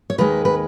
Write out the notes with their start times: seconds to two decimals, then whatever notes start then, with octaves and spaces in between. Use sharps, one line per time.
0.10 C#5
0.18 D#2 D#3 G#3 B4
0.45 B4